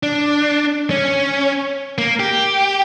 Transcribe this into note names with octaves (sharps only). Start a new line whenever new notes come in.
D4
C#4
A#3
G4